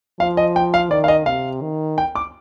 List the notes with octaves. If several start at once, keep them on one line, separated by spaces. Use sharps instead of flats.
F3 F5
D#5
G5
F5
D#3 D5
F5
D#5
C3 F5
D#3
G5
D6